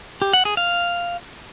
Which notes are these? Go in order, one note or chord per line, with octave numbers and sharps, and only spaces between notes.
G4
F#5
G#4
F5